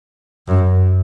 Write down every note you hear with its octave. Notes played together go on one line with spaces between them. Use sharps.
F#2